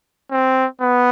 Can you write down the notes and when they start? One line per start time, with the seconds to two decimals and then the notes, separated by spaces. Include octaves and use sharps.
0.31 C4
0.81 B3